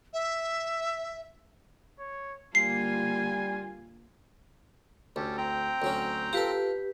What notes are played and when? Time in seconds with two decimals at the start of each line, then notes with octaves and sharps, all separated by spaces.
0.13 E5
2.00 C#5
2.55 D3 G3 A#3 F4 G#5 C7
5.16 D2 C#4 G4 A4
5.37 C4 G5 A#5
5.82 D2 F#3 C#4
6.33 F4 G4 A4 B4